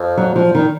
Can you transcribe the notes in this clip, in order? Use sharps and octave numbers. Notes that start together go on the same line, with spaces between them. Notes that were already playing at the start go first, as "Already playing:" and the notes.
Already playing: F2
F#3
F3
D#3